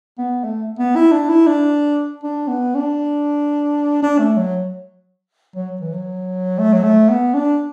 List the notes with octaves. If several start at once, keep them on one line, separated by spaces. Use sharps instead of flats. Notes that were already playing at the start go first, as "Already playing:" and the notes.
B3
A3
B3
E4
D4
E4
D4
D4
B3
D4
D4
A3
F#3
F#3
E3
F#3
A3
F#3
A3
B3
D4